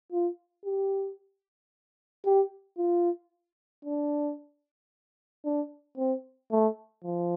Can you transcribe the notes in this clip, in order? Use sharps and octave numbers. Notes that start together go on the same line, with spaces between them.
F4
G4
G4
F4
D4
D4
C4
A3
F3